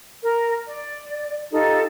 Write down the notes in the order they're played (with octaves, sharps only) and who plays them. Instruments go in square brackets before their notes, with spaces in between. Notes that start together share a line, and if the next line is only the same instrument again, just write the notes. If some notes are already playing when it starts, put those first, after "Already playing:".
[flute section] A#4
D5
D#4 F4 G4 A4